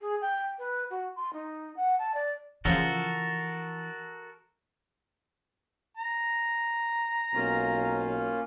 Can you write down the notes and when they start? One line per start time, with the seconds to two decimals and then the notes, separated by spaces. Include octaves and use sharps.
0.01 G#4
0.22 G5
0.59 B4
0.90 F#4
1.16 C6
1.33 D#4
1.76 F#5
1.99 A5
2.14 D5
2.65 C#3 E3 F3 F#4 A4 A#4
5.97 A#5
7.34 B1 A#3 C#4 F4